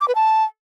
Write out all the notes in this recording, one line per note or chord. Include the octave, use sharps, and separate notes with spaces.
D6
B4
A5